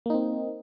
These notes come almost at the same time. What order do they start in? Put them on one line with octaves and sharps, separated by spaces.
A#3 D#4 C4